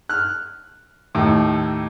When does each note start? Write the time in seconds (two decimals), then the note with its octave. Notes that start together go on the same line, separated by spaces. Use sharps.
0.09 F6 F#6
1.15 D#2 A2